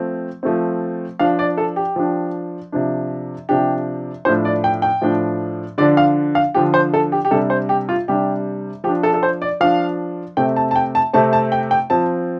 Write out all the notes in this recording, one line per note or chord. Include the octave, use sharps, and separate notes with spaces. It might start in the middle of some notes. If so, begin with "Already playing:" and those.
Already playing: F3 A3 C4
F3 A3 C4
F3 D4 F5
D5
A4
G4
F3 D4
C3 F3 D4
C3 F3 D4 G4
A2 F3 D4 C5
D5
G5
G5
A2 F3 D4
D3 F3 D4 D5
F5
F5
D3 F3 D4 G4
C5
A4
G4
G4
C3 G3 D4 A4
C5
G4
F4
C3 G3 D4 G4
F3 D4 G4
A4
A4
C5
D5
F3 D4 F5
C3 A3 C4 G5
A5
A5
G5
A5
C3 A3 C4 A5
A5
G5
G5
F3 C4 A5